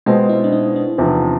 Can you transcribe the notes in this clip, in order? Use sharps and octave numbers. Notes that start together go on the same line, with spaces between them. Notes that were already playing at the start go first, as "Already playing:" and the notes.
B2 G#3 C4 F4
E4
D4
D#4
D4
E2 C3 F3